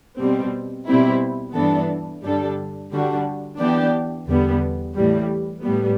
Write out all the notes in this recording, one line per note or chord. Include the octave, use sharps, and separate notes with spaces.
B2 G3 C4
B2 G3 C4 E4
G2 E3 B3 D4 A4
G2 D3 G3 D4 A4
D3 G3 D4 F#4
E3 B3 D4 G4 D5
E2 D3 G3 B3
A2 E3 G3
A2 G3 B3